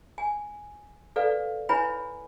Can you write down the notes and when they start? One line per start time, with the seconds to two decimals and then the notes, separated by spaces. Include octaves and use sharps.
0.18 G#5
1.16 A4 B4 D5 F5
1.69 E4 B4 C#5 G#5 B5